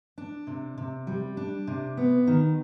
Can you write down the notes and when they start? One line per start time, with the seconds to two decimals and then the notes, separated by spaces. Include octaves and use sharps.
0.18 D4
0.47 C3
0.78 C3
1.07 G3
1.37 D4
1.67 C3
1.97 B3
2.27 D#3